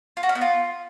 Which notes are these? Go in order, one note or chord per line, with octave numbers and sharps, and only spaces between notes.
F4
F#4
C#4
B3
F4